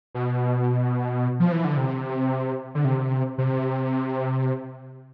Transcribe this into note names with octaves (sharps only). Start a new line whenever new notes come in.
B2
F3
E3
D3
C3
D3
C3
C3